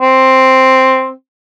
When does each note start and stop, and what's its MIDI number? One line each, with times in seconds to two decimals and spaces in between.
0.01 1.11 60